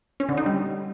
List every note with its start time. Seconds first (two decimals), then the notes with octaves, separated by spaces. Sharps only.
0.20 C#4
0.29 D3
0.37 D#4
0.46 G3